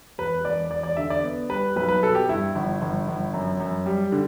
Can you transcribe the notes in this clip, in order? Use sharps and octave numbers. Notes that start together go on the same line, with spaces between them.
E1 B4
E1 D5
E1 D5
D5
D3 E5
D5
B3
G3 B4
B1 B4
B4
B2 A4
G4
G2 E4
G1
G1
G1
F#2
F#2
G3
D3